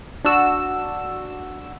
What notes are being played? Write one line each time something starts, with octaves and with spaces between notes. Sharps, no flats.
D4 F#4 E6